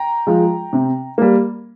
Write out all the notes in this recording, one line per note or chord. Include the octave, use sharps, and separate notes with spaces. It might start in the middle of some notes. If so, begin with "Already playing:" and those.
Already playing: G5 A#5
F3 G#3
C3
G3 A#3